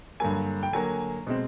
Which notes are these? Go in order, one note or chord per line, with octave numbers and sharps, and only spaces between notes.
G2 D3 F#3 A#3 G#5
G5
D3 F#3 A#3 G#5
B2 G#3 C4